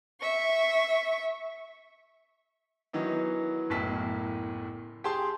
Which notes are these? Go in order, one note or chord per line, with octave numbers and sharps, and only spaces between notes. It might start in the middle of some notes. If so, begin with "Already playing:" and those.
E5 C#6
D#3 E3 F#3 B3 D#4
F#1 B1 A2 A5 B6
G4 G#4 A5 C6